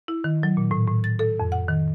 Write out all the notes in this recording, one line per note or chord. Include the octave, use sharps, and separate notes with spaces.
E4
D#3
F#3
A#2
A2
A2
A6
A4
F2
F#5
D#3